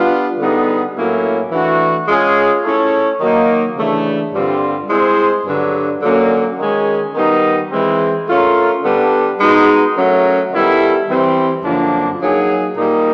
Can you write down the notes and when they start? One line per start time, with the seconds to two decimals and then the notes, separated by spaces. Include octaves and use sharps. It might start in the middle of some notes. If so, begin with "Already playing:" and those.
Already playing: G3 B3 D4 F4
0.39 D3 G3 B3 D#4 G#4
0.96 A2 F#3 A#3 C#4 E4
1.52 E3 A3 D4 F#4
2.08 G#3 C#4 F4 G#4
2.64 A3 C#4 E4 A4 C#5
3.21 D#3 F#3 A#3 D#4
3.77 C#3 E3 A3 D4
4.33 G2 D3 G3 C4 F4
4.90 G#3 C4 E4 G#4 C5
5.46 G2 D3 F#3
6.02 D3 F#3 A#3 C#4
6.59 D#3 G#3 C#4
7.14 D#3 G3 B3 D#4
7.71 E3 G#3 C4
8.27 A3 C#4 F4 A#4
8.84 D3 G3 B3 D4
9.39 G#3 B3 D#4 F#4
9.96 F#3 A3 C#4 F#4 A#4
10.52 D#3 G3 B3 E4 A4
11.09 E3 G3 C4
11.65 F#2 D3 F3 A#3 D4
12.21 F#3 A#3 D#4 G#4
12.77 A#2 G3 A#3 D#4